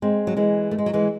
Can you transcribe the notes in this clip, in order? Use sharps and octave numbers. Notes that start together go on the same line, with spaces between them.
G#3 C4
F#3
E3 G#3
A3
G#3
F#3
E3 G#3